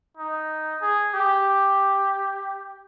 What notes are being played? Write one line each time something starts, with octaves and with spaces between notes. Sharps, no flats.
D#4
G#4
G4